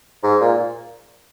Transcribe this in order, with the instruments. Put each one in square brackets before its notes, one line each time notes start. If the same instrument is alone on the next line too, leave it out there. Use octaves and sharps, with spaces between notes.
[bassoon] G#2
A#2